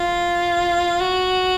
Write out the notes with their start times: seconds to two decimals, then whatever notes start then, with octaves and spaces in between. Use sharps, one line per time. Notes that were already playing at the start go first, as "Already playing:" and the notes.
Already playing: F4
1.01 F#4